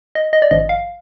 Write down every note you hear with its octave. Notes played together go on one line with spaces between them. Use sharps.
D#5
D#5
D5
G#1 G2 F3 D#5
F5